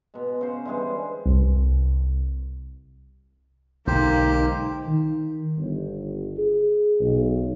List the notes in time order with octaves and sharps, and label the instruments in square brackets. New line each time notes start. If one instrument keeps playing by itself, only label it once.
[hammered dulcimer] B2 G#3
C#3 C5
D3 E3 G3 G#3
[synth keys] C2
[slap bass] B1 D3 G#3 [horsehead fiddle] A#3 D#4 [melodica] G4 C5
[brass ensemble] D#3
G1
G#4
B1